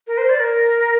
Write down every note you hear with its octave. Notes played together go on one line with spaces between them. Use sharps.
A#4
C5
D5
A#4